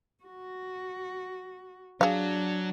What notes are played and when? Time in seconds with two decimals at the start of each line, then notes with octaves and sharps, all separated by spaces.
0.24 F#4
2.01 F#3 D4 G#4 F5